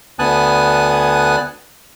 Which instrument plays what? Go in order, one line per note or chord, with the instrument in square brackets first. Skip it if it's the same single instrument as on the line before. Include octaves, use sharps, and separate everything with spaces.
[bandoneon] D2 B3 G#5 A5 D#6 F#6